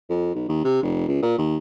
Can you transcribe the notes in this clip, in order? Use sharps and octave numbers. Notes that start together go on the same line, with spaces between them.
F2
B1
D#2
C3
F1
C#2
A#2
D#2